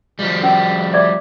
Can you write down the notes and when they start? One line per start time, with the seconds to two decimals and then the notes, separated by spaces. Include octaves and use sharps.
0.19 F3 G3
0.41 C#4 A#4
0.94 D5 E5 D6